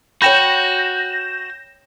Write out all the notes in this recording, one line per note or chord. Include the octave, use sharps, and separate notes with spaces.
F#4 C#5 G5 B5 G6 A#6 E7